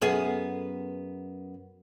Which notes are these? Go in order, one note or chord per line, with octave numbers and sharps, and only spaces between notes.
F#2 B3 G#4